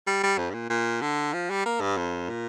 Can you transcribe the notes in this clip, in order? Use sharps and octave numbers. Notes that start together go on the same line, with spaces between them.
G3
G3
F2
G2
A#2
A#2
D3
F3
G3
A#3
G2
F2
A#2